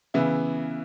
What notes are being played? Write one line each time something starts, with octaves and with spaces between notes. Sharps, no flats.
C#3 E3 B3 E4